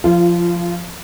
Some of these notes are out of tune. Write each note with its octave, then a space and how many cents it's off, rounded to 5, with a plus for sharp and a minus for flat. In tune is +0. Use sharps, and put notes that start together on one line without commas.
F3 +0 F4 -25